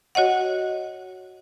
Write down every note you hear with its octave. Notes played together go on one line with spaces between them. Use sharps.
F#4 C#5 D#5 F#5